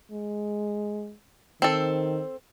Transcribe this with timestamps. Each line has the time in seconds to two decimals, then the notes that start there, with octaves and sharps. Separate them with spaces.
0.12 G#3
1.62 D#3 C4 A4